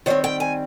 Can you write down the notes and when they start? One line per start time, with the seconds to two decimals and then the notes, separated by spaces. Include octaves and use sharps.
0.06 D#3 G3 C4 C#5
0.24 G5
0.40 G#5